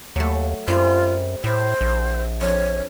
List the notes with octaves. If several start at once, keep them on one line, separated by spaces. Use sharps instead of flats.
D#2 F#3 A3
F#2 G3 C4 F4
A2 E4 C5 E5
A#1
F2 D4 C#5